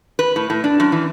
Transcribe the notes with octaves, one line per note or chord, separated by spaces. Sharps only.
B4
A2
A2
D4
F#2
E3